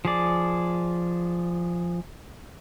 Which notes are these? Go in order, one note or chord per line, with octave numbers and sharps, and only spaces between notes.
F3 G#4 D5